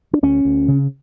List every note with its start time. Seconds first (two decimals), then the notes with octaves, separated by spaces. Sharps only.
0.13 D4
0.23 D2 C#4
0.45 D2
0.68 C#3